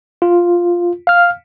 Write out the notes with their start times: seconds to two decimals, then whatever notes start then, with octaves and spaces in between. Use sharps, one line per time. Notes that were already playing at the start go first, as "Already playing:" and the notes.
0.22 F4
1.07 F5 F6